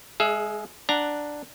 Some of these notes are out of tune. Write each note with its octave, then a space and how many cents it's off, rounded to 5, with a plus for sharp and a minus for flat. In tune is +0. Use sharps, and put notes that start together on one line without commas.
G#3 -5 G#4 +25 E5 +25
D4 +0 F#5 +0 A#5 +0